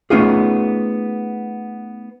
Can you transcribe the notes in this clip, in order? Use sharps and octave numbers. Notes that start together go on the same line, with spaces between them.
A3 B3 C#4 D#4 F4 G#4